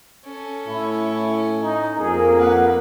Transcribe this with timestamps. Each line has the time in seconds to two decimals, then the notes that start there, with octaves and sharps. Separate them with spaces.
0.25 C#4 A4
0.67 A2 E4
1.61 D#4
1.98 F2 A#3 G#4
2.38 B4 F#5